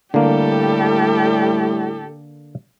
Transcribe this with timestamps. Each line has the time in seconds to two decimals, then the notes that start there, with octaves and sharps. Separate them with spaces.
0.14 A2 D3 G3 A#3 G4 A4